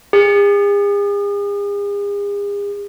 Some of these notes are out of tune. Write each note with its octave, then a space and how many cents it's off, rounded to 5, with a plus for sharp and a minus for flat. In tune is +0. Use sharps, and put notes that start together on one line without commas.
G#4 -45